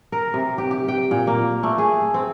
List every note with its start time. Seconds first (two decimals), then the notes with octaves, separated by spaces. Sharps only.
0.12 A#4
0.34 C3
0.58 G4
0.71 G4
0.88 G5
1.11 A#2
1.27 A#3
1.63 A3
1.78 G#4
2.14 C4